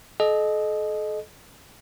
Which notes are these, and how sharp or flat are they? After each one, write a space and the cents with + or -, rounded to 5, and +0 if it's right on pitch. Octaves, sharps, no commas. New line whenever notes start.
A4 -40 D#5 -15